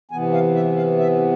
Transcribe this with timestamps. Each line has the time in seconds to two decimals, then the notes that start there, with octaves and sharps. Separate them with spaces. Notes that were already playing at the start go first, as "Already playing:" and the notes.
0.11 C3 E3 B3 G#5
0.33 F5
0.55 E5
0.77 F5
0.99 E5